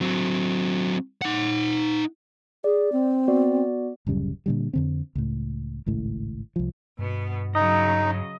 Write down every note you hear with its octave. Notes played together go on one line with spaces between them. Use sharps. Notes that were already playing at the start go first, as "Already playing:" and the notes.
F#3 C4
D#4 F#5
G#4 D5
C4
B3 F#4 D5
D1 F#2 C#3 G3
A#2 D3 G3
F2 D3 C4
C#2 A2
G#1 C#2 A2
C2 F3
G2 B2 B3
C#3 F#3 D#4 D#5